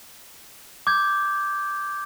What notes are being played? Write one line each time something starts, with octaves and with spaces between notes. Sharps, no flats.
D6 G6 G#6